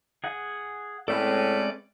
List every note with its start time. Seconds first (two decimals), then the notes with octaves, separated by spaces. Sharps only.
0.24 G#4 F#5 G#5
1.08 A2 G#3 A3 C4 C#4 A4 B4 D5